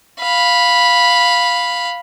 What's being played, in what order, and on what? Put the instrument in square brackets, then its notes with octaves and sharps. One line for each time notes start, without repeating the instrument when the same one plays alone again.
[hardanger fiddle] F5 B5